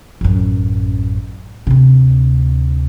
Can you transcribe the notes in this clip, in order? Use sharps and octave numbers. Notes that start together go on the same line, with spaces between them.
A1 F#2
D2 C3